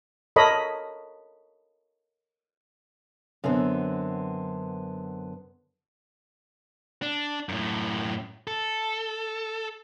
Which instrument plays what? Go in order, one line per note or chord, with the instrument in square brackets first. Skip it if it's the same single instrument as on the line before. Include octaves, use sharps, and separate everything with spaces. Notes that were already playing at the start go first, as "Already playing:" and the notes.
[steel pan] A4 A#4 C#5 D#5 B5
[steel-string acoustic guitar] F#2 D3 B3 C4
[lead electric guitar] D4
F#2 A2
A4